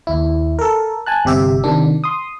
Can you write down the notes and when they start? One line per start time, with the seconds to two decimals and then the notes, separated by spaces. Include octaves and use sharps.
0.07 D#2 E4
0.59 A4 A#4
1.06 G#5 A5 F#6
1.25 G1 C3 G4 E5
1.64 C3 D#3 D4
2.04 C6 D#6